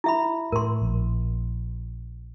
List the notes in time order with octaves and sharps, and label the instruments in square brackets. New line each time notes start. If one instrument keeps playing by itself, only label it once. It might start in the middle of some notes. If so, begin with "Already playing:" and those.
[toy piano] E4 E5 B5
[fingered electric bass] A2 [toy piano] A#4 C6
[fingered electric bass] A#1